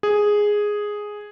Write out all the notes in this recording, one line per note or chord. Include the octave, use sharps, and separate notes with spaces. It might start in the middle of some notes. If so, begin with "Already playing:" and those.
G#4